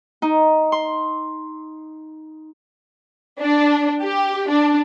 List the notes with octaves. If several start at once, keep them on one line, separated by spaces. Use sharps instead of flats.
D#4
C6
D4
G4
D4